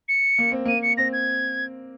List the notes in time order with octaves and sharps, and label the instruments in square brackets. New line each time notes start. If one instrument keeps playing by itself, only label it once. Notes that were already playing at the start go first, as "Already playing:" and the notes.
[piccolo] C#7
[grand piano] A#3
C4
[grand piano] A#3 [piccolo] D#7
[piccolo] C#7
[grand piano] C4 [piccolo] A#6
[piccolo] G#6